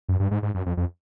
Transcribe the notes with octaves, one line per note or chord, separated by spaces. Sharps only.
F#2
G2
G#2
G#2
F#2
F2
F2